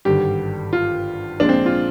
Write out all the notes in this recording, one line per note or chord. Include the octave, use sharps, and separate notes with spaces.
G#1 G2 D3 G3 G4
F4
A#1 A#2 G#3 D4
C4
F4